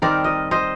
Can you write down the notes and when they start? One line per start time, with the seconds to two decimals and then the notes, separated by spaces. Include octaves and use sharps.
0.02 D#3 G3 C4 A#4 D5
0.24 D#5
0.51 C5 D#5